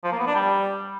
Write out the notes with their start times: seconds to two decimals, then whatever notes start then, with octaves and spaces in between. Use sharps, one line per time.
0.04 F3
0.11 A#3
0.19 B3
0.27 D4
0.34 G3